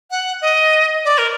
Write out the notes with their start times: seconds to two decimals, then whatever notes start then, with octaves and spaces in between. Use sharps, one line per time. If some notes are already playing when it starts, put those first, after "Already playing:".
0.11 F#5
0.42 D#5
1.05 D5
1.18 A#4